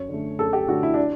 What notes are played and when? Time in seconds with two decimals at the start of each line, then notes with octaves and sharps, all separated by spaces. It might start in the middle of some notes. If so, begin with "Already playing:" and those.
Already playing: F#2 C#5
0.08 D3 A3
0.39 F#2 A4
0.53 G4
0.68 D3 A3 F#4
0.83 E4
0.94 D4